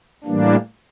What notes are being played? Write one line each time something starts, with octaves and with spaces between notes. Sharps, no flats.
A2 E3 G3 A#3 D4